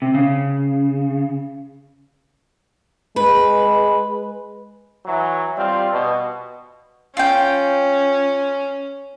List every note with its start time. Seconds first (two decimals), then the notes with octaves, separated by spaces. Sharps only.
0.02 C3
0.14 C#3
3.16 G#3 B4
5.05 E3 F#3
5.56 G3 C4 F4
5.92 B2
7.17 C#4 F4 G5